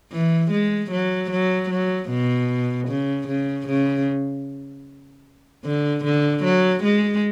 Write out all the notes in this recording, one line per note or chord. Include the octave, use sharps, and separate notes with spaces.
E3
G#3
F#3
F#3
F#3
B2
C#3
C#3
C#3
D3
D3
F#3
G#3